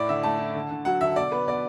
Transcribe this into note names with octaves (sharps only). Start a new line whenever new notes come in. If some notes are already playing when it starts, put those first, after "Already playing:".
Already playing: A2 E4 D5
D3 E5
A3 A5
E4
D3
D3
F#3 F#5
D3 E5
B2 D5
B3 B4
B2 D5